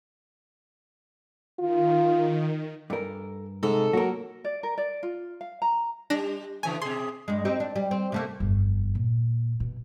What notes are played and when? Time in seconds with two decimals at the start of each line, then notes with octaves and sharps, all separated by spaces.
1.59 D#3 F4
2.90 G2 A4 A#4 G#5
3.63 G#2 C3 A4
3.93 F#3 A#3 F#4 A#4
4.44 D5
4.63 A#4
4.78 D5
5.03 F4
5.41 F5
5.62 A#5
6.10 G3 D4 A#6
6.63 C#3 E3 A3 G#5
6.82 B2 G#4 C6
7.28 G2 G#3
7.45 C4 D#4 G4
7.60 D4
7.76 G3
7.91 C4
8.12 C3 A3 A#3
8.40 G1 F2
8.95 A#2
9.60 B2